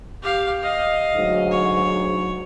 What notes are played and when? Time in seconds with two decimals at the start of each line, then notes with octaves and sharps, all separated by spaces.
0.22 G4 F5
0.63 D#5 F5
1.16 D2 G#2 F#3
1.51 C#5